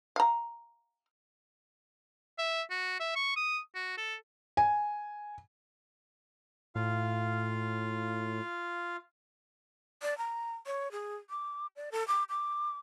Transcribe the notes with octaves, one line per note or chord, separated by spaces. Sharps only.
F5 A#5
E5
F#4
E5
C#6
D#6
F#4
A4
G#5
A2 F4 F5
D5
A#5
C#5
G#4
D6
D5
A4
D6
D6